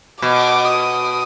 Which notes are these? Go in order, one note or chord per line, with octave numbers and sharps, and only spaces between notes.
B2 D6
D#6